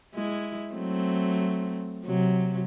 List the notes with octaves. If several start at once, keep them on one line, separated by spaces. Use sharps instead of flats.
G#3 E4
F#3 A3 C4
C3 F#3